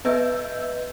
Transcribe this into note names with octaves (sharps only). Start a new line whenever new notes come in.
B3 B4 D#5 E5 E6 G6